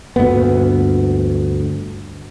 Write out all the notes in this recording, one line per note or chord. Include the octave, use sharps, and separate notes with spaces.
D2 G2 A#2 B3